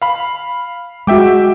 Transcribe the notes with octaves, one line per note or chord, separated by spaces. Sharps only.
F5 B5
G#3 F#4 E5 G5 D6